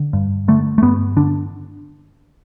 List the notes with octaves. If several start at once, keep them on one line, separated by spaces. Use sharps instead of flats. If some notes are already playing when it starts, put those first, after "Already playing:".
Already playing: D3
G2
D3 A3
A3
G2 B3
D3 D4